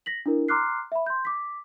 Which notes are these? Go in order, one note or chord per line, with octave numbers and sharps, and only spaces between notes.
A#6 B6 F#7
D4 E4 A#4
A#5 C6 D6 F6 F#6 C7
E5 B5
C6 G6
D6 B6